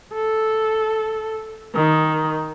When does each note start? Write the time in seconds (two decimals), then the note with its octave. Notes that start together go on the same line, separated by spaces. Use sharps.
0.14 A4
1.75 D#3